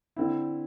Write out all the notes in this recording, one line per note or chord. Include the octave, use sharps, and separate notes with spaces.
D3 C4 E4